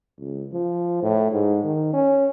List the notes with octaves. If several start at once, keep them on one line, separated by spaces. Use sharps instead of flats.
C#2
F3
A2
G#2
D#3
C#4